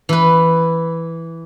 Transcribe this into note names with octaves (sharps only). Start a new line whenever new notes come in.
E3 B4